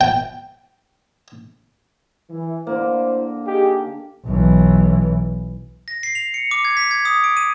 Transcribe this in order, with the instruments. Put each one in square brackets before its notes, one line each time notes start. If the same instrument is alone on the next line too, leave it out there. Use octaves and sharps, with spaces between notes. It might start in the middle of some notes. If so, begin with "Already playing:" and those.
[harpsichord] G5
[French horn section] E3
[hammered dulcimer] D3 A#3 [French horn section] E4 C5
[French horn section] D#4 G#4 [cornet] G4
[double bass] B1 E3
[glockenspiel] A#6
C7
F7
C#7
D6
G#6
B6
G#6
D#6
D7
D#7